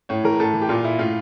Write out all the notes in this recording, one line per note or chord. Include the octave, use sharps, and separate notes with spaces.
A2 C#5
E3 A#4
A2 A4
E3
G4
A#2 F4
E4
A2 F4